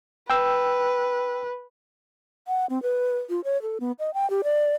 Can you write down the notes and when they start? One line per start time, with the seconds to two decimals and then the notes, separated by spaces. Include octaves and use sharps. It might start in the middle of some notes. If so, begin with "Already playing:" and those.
0.30 B4 G5 E6
2.48 F#5
2.70 C4
2.83 B4
3.30 F4
3.44 C#5
3.62 A4
3.80 B3
3.99 D#5
4.14 G5
4.30 G4
4.44 D5